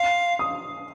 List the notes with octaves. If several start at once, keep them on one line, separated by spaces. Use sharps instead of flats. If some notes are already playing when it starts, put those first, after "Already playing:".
Already playing: F5 C6
D#6